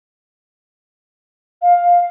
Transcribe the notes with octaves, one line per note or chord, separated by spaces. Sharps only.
F5